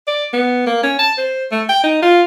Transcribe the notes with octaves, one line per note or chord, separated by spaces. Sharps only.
D5
B3
A#3
C#4
A5
C5
A3
G5
D#4
F4